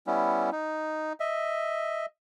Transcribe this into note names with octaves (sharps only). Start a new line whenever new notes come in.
G3 B3 C#4 E4
D#4
D#5 E5